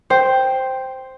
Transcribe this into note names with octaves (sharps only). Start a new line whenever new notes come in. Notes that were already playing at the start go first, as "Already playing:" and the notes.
C5 G5